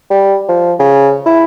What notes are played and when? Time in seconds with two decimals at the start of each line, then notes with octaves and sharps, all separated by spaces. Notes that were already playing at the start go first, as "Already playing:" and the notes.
0.10 G3
0.49 F3
0.79 C#3
1.25 E4